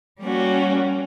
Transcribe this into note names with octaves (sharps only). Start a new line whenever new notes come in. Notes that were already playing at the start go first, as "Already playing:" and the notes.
G3 A#3 C#4 F#4